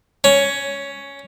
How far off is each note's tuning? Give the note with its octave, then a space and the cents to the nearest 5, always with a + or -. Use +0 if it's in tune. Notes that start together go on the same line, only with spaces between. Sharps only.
C#4 +10